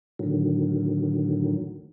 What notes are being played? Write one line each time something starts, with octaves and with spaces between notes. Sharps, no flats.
A2 D3 D#3 F#3